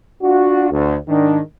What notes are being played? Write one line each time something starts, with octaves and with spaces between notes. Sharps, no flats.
D4 F4 F#4
D2
G#2 D#3 D4